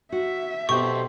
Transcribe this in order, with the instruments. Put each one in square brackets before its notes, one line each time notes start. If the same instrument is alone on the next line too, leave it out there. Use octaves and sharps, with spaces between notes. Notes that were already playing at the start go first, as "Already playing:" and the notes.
[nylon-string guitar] F#4 [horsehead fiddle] E5
[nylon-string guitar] B2 G5 [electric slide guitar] G4 A4 C5 [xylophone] C#6